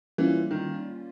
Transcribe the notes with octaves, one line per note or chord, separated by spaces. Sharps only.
E3 G3 A#3 C#4 F4
D#3